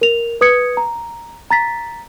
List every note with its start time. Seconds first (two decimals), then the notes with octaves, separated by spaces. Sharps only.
0.01 A#4 F7
0.41 B4 D#6 G#6 C#7
0.77 A#5
1.51 A#5 A6 B6